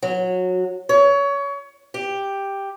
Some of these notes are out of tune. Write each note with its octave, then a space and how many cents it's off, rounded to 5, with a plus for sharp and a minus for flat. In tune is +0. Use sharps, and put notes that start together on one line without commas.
F#3 -20
C#5 +25
G4 +5